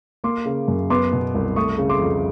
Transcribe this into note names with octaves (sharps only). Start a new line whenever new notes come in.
A#3 C6 D6
C#3
F#2
B3 C6 D6
B2
C2
A3 C#6 D#6
C#3
C6 D6
F2